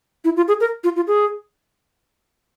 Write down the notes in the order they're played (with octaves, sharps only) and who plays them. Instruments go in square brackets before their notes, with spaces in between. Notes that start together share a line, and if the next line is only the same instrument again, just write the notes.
[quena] E4
F4
G#4
A#4
F4
F4
G#4